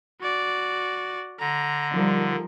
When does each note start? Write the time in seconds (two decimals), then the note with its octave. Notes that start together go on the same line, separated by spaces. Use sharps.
0.21 F#4 D5
1.40 D3 A#5
1.90 F3 G3 D#4 A#4